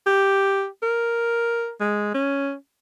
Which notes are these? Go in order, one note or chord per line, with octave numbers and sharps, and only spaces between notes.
G4
A#4
G#3
C#4